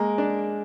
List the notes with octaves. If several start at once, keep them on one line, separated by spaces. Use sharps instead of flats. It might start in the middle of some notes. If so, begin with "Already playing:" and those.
Already playing: G#3 A#3
D4